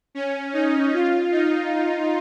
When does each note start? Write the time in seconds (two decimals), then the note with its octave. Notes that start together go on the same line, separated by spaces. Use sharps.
0.15 C#4
0.53 D#4
0.93 F4
1.32 D#4